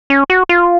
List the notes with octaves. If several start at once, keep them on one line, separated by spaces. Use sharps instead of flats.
C#4
F#4
F4